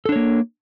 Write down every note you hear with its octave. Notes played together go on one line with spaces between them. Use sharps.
A#3 D4 A4 C#5